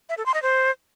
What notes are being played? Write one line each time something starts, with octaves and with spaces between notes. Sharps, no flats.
E5
A4
C6
D#5
C5